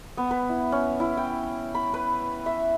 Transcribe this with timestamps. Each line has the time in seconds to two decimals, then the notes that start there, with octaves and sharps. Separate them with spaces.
0.17 B3
0.31 B4
0.49 E4
0.72 C#4
1.00 E4
1.17 G5
1.75 B5
1.94 B4
2.46 E5